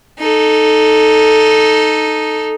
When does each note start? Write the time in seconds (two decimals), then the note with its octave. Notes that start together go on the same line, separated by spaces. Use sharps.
0.19 D#4 A4